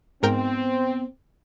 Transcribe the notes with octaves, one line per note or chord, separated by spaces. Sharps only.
G#2 B3 C4 A#4 G5